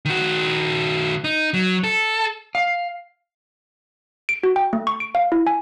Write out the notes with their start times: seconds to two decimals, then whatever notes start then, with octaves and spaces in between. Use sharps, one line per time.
0.05 D#3 F#4
1.24 D#4
1.54 F#3
1.84 A4
2.55 F5
4.29 D7
4.43 F#4
4.56 G5
4.73 A3
4.87 C#6
5.00 D7
5.15 F5
5.32 E4
5.47 G#5